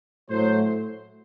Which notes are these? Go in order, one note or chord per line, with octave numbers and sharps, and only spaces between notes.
A2 F#3 A3 C5